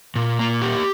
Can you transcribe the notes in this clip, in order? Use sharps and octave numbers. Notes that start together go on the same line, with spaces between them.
A#2
A#3
G4